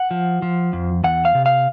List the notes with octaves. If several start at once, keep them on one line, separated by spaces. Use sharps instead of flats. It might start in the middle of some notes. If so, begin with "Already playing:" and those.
Already playing: F#5
F3
F3
F2
E2 F#5
F5
C3
F5